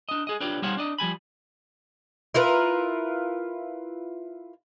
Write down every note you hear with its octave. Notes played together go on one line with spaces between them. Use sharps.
D4 D#5
G#4 D#5
D4 F4 G4 B4 C#5 D5
G3 D#4 C5 C#5 F5 F#5
D4 D5 D#5
F3 G3 G#5 B5
E4 F4 A#4 B4